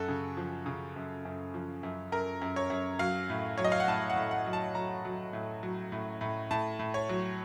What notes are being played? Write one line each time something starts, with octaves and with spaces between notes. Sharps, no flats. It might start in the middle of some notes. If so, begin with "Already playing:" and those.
Already playing: F#2 F#4 A4
C#3
F3
C#3
F#2
F#2
F3
F#2
F#2 A#4
F#2
C#5
F#2
F#3 F5
A2
F#3 C#5
D#5
F5
F#5
A2 A5
F#5
A2
F#5
F#3
A5
F#3 A#5
F#3
A2
F#3
A2
A2
A2 A5
A2
C#5
F#3